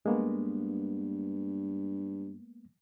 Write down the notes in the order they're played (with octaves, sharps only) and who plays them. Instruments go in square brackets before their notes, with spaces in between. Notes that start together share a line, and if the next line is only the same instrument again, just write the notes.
[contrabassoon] G2 [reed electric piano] G#3 A#3 B3